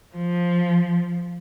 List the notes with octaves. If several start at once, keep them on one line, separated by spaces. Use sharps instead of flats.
F3